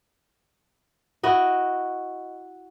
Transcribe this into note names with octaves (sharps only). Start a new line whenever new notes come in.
E4 F#4 D#5